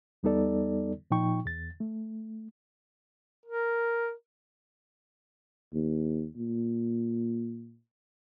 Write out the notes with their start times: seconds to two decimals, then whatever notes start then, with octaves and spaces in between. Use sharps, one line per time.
0.23 E2 G3 B3 D#4 A4 D5
1.11 A#2 F3 D#4 G5 C#6
1.46 E2 A6
1.80 A3
3.46 A#4
5.73 D#2
6.36 A#2